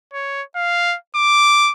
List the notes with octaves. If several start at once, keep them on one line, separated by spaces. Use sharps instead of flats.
C#5
F5
D6